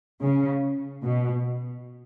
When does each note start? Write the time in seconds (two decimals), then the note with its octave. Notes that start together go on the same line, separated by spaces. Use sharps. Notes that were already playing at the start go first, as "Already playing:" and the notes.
0.21 C#3
1.03 B2